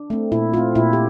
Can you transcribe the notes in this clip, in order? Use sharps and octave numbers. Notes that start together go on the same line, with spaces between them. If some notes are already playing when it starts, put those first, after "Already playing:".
Already playing: D4
A3 C4
A#2 E4
A3 C4 F4
A#2 E4
G4